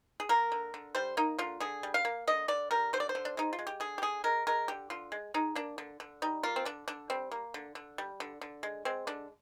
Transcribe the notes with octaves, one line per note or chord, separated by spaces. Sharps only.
G#4
A#3 A#4
D3
D3
G3 C5
A#3 D#4
D3 F4
D3 G#4
G3
F5
A#3
D3 D#5
D3 D5
G3 A#4
D3 C5
D5
C5
D3
D4
G#3 D#4
F4
G#3
G4
D3 G#4
G4
D3 G#4
G#3 A#4
G#3 A#4
D3 G4
D3 F4
G#3
G#3 D#4
A#3 D4
D3
D3
G3 D#4
A#3 F4
C4
D3 D4
D3 D4
G3 C4
A#3
D3
D3
G3
D3
D3
G#3
G#3 C4
D3 D4